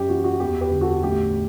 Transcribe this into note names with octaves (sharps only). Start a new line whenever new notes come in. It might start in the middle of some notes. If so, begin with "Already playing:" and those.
Already playing: F#2 G4
E3 F#4
F#4
E2 G4
G4 B4
D3
F#4 A4
A1 G4